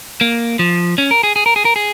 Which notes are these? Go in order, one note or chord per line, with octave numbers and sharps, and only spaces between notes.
A#3
F3
C#4
A#4
G#4
G#4
A#4
G#4
A#4
G#4